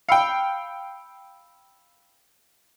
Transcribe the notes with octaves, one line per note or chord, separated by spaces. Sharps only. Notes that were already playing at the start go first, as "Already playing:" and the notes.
F5 G5 B5 E6 C#7